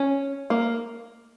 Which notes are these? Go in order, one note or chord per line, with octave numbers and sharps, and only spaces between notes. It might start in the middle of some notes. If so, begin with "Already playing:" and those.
Already playing: C#4
A#3